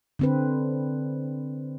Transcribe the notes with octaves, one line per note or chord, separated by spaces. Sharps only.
D3 C4 B4